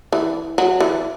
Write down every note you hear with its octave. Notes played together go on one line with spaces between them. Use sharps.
E3
F#3
E3